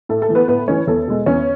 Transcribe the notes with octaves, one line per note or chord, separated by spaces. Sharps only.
A2 A4
A4
E3 A3
B3 B4
A2 B3 B4
E3 A3 C#4 C#5
E2 A4
B2 G#3
E2 C#4 C#5